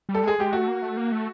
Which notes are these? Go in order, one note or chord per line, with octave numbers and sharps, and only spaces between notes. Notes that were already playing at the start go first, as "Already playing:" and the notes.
G3
A4
G#3 G#4
G#3 G4
A3 F#4
A#3
A3
A#3
A3